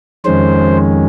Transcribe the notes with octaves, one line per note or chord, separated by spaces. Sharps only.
F2 D#3 G#3 C#4 C5